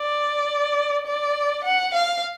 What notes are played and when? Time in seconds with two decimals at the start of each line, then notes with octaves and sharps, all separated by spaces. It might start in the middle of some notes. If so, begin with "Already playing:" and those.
Already playing: D5
1.07 D5
1.65 F#5
1.95 F5